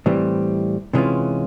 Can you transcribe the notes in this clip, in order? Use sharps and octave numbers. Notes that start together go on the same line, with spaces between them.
A2 E3 G3 C4
C3 E3 G#3 C#4 F4